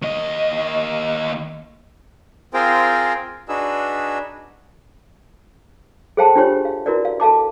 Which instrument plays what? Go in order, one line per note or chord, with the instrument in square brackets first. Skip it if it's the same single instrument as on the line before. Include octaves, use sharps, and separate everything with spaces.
[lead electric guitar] D#2 D#5
[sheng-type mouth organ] C4 F4 G#4 A#4 C5 G5
D4 D#4 F#4 G#4 B4 E6
[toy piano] G#4 A4 C5 F5 G5 A5
D4 F4 G4 C5 C#5
F5
E4 F#4 A#4 B4 D5
F5
A4 F5 A5 D6